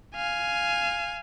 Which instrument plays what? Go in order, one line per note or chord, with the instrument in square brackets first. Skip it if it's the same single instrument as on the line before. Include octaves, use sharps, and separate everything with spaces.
[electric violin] F5 G#5